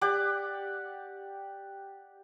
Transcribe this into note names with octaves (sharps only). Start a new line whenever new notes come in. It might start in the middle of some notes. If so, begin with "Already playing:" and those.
G4 D5 F#5 D6